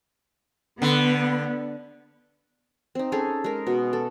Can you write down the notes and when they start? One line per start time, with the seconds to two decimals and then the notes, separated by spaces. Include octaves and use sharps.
0.82 D3 B3
2.95 C4 D#4
3.12 C#4 G#4 A4
3.44 G#3 A#4
3.67 B2
3.93 A4